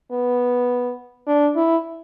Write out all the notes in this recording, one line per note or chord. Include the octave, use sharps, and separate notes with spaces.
B3
D4
E4